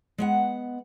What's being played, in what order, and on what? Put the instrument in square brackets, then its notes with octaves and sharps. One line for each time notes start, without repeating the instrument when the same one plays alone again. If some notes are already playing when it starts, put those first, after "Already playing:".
[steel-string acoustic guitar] G#3 B3 F#5